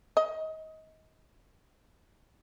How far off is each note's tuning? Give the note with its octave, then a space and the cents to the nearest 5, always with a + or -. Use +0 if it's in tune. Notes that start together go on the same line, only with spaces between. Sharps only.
D#5 +25